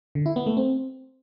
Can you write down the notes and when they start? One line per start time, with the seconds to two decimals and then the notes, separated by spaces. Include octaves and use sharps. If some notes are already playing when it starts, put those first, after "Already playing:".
0.15 D3
0.26 E4
0.36 B3
0.46 A3
0.57 C4